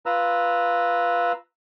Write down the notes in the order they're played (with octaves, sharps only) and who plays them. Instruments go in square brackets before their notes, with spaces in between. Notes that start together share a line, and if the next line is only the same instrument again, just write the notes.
[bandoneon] F4 B4 A#5 E6